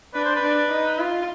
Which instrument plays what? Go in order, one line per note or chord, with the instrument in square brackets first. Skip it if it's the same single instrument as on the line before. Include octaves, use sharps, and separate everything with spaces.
[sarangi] D4 [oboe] B4
[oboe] C5
B4
[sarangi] D4
D#4
F4